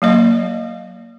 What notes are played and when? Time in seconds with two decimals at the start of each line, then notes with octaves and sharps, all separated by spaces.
0.02 F#3 A#3 D#5